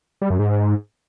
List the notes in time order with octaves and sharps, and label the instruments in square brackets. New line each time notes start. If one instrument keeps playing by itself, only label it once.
[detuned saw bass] G3
F#2
G#2